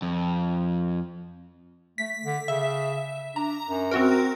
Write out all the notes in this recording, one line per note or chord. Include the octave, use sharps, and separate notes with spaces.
F2
A3 B6
D3
C#3 E5
D4 A#5
F#2
C4 F#4 A#4